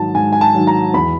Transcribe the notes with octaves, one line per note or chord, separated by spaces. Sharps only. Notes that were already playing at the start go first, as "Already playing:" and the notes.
Already playing: G#2 D#3 F#3 A5
G#2 G#5
G#5
A5
D#3 F#3
A#5
E2 B5